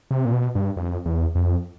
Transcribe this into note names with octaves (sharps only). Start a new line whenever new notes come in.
C3
A#2
B2
G2
F2
E2
F2